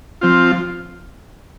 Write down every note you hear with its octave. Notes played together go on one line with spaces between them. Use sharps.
F3 C4 F4